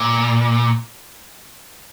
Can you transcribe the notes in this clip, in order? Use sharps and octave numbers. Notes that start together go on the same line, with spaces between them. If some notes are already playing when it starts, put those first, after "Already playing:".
Already playing: A#2